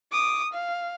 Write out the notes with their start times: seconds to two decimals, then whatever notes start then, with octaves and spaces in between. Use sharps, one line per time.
0.12 D6 D#6
0.53 F5